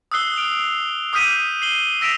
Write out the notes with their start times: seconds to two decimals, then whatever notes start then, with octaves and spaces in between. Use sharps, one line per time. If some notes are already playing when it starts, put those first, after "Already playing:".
0.12 D#6 E6 F#6 C7 G7
0.36 F6 D7 F7
1.13 D6 D#6 F6 G6 B6 D#7
1.62 C7 F#7 G7
2.01 E6 A#6 B6 D7 E7 F7